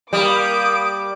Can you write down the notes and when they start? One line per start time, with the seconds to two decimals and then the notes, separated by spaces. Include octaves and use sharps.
0.13 G3 A#3 D6 D#6 D7